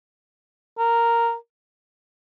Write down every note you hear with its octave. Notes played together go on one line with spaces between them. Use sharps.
A#4